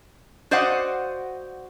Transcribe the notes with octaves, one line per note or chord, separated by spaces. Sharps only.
F#4 C5 D5 D#5 F5 F#5